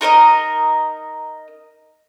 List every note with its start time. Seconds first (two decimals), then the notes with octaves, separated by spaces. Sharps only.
0.01 D#4 A#4 C5 D#5